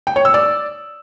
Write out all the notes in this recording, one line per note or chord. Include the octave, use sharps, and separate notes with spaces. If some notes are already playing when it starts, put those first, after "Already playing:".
G5
C#5
E6
D5